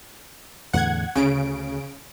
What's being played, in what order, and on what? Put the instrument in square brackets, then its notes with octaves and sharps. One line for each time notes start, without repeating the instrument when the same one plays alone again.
[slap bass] E2 A2 D3 [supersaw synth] F#5 G#6
[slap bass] D2 C#4 [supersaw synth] C#3 D7